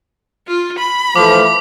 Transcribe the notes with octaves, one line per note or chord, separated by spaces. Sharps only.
F4
B5
E3 F3 A3 D6